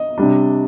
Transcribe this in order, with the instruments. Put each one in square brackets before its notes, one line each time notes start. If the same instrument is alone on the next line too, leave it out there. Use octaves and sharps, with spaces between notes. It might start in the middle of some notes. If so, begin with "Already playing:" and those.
Already playing: [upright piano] D#5
C3 G3 D4